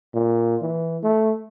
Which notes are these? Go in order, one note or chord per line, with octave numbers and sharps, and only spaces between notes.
A#2
E3
A3